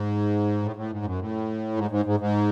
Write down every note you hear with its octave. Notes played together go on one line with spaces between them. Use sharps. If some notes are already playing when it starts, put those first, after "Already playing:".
Already playing: G#2
A2
A2
G#2
F#2
A2
G#2
G#2
G#2
G#2